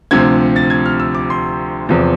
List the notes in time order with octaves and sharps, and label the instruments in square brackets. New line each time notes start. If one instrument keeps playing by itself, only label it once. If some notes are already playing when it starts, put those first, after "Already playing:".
[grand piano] D2 C3 F3 G#6
A6
G#6
F6
E6
D6
C6
E2 C3 F3